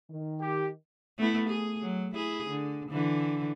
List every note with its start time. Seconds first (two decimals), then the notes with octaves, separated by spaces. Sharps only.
0.11 D#3
0.41 G4
1.18 A3 B3 E4
1.49 G#4
1.82 F#3
2.15 E4 G#4
2.50 D3
2.90 D3 E3